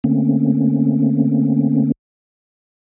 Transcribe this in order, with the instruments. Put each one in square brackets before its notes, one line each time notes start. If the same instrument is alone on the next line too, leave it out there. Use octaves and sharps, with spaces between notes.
[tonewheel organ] D3 A3 A#3 C4 C#4